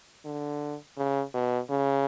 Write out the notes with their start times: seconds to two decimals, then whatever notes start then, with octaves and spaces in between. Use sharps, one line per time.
0.25 D3
0.98 C#3
1.34 B2
1.70 C#3